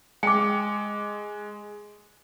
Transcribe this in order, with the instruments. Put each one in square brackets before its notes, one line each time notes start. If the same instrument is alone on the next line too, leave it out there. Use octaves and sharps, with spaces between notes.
[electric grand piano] G#3 [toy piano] G5 D6